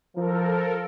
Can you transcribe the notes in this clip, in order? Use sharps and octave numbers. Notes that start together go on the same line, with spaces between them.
F3 A4 A#4